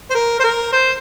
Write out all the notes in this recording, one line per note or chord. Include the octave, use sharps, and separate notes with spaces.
C5
A#4
C5
A#4
C5